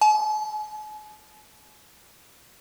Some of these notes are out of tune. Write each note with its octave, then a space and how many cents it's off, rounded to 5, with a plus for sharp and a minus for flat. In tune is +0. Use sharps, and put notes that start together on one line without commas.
G#5 +45